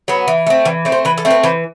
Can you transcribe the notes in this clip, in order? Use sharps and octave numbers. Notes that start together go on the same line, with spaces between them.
F#3 B3
E3
A3 C4
E3 D5
A3 C4
C5
E3 B4
A4
A3 C4
B4
E3 C5